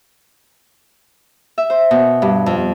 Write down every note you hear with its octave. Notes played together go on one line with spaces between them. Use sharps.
E5
C5
B2
G2
F2